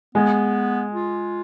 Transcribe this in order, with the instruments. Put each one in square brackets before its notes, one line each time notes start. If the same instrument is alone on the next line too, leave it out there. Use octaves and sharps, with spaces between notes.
[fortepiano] G#3 [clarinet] B3
[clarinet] F4